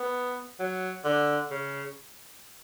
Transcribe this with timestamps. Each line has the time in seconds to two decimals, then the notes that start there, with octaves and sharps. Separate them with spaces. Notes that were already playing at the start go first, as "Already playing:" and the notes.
Already playing: B3
0.60 F#3
1.05 D3
1.51 C#3